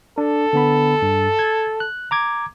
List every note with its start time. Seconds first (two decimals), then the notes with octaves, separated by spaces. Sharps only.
0.18 D4 A4
0.53 D3 B3 B5
1.02 G2
1.39 G#6
1.80 F#6
2.11 A#5 D6 G#6